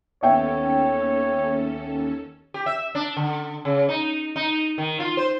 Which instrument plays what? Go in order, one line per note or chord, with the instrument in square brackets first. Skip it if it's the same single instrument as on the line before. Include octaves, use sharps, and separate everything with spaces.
[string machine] D#2 C#4 A4 [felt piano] B3 E5 G5 [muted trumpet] C#5
[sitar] G4
E5
D4
D3
C#3
D#4
D#4
D#3
F4
C5